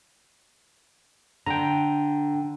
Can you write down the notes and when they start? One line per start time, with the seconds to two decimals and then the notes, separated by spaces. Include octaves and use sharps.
1.46 D3 G5 A#5